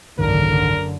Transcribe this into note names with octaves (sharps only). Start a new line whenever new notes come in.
F#1 C2 G#2 D3 D#3 A#4